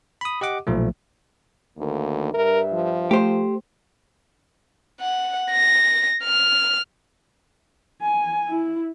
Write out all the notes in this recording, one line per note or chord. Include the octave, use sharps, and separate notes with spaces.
B5 D#6
G4 D#5 F#5 D6
B1 A#2 F3 A3
D2 D#3 A#3
G2 A#4 E5
F3
A3 G4 C5
F#5
A#6
F6
G#5
E4